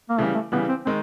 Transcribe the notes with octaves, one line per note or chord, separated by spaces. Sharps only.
A#3
C#3 E3 G3 A3
A3
C#3 E3 G3 B3
C4
D#3 G#3 C4